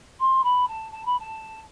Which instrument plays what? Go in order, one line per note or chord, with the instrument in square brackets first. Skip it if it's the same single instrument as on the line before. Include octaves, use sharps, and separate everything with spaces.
[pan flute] C6
B5
A5
A5
B5
A5